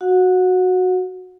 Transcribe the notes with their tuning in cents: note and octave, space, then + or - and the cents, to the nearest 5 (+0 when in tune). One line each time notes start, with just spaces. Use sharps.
F#4 -5 F#5 -30